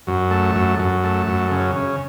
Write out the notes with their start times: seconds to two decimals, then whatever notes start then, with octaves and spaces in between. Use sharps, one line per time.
0.07 F#2
0.31 A3
0.55 F#2
0.79 F#2
1.04 A3
1.27 F#2
1.51 C#3
1.76 C#3